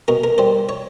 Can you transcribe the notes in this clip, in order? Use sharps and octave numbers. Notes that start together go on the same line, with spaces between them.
B2 A#4
A#4
G3 C5
C#5